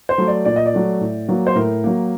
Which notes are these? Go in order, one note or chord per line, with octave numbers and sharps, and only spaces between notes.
C5
F#3 A3
D5
A#2 D5
D#5
D5
F#3 A3
A2
F#3 A#3
C5
A2 A#4
F#3 A#3